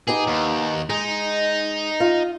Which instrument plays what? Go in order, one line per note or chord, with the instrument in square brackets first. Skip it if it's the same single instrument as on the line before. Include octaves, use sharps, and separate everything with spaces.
[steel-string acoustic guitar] B3 D#4 G4 [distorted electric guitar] G#4
[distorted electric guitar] D#2
[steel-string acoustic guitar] G#3 [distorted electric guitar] D#4
[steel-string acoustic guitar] F4